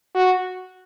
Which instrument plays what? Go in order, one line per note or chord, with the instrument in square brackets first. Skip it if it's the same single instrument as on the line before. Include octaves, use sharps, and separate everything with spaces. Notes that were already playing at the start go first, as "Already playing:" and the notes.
[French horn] F#4